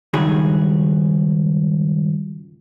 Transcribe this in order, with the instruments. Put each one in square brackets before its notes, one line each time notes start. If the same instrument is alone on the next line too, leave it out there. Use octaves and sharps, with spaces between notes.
[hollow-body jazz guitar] C#2 G2 D#3 F#3 G#4 B5